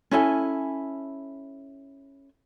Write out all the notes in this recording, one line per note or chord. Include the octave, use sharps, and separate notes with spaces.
C#4 E4 A4 G#5